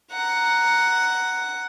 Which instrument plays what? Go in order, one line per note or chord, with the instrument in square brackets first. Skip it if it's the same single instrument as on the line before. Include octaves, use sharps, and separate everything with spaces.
[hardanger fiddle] F#5 A#5